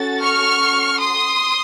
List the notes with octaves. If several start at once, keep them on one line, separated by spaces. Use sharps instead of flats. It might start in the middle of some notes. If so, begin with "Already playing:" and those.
Already playing: C#4 F#4 A4 A6
C#6 F6
C6 D#6